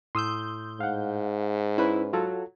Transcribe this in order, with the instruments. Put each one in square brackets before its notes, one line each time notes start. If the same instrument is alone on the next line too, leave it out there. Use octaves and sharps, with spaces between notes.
[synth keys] A2 G6 [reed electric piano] C6 D#6 E6
[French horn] G#2 [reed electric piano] F5 F#5
[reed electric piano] C#4 B4 [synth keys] E4
[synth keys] F#3 [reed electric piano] F4 A4